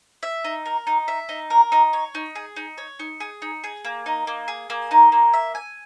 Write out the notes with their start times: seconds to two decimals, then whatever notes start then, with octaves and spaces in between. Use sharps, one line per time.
0.23 E5
0.44 D#4
0.66 A#4
0.87 D#4
1.08 E5
1.29 D#4
1.50 A#4
1.72 D#4
1.93 C#5
2.15 D#4
2.35 G#4
2.56 D#4
2.78 C#5
2.99 D#4
3.20 G#4
3.42 D#4
3.64 G#4
3.85 A#3
4.06 D#4
4.27 A#3
4.48 G#4
4.70 A#3
4.91 D#4
5.12 A#3
5.34 E5
5.55 G#5